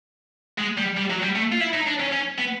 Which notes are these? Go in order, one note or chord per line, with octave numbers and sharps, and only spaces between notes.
G#3
G3
G3
F#3
G3
A3
F4
E4
D#4
D4
C#4
C#4
B3